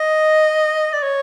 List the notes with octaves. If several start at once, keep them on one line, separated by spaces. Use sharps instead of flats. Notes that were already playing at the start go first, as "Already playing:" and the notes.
Already playing: D#5
D5
C#5